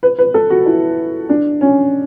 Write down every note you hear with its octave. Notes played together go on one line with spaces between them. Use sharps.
B4
B4
A4
F#4
E4
D4
C#4